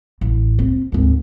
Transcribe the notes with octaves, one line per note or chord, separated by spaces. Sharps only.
A1
C4
G#1 D2